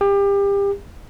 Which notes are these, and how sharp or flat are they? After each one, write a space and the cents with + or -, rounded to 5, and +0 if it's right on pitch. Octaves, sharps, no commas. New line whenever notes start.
G4 +30